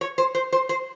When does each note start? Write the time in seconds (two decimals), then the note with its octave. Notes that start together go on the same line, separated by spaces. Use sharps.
0.01 C#5
0.18 C5
0.35 C5
0.52 C5
0.69 C5